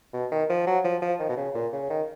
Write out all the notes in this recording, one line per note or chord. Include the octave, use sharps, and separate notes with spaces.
B2
D#3
F3
F#3
F3
F3
D#3
B2
C#3
A#2
C#3
D#3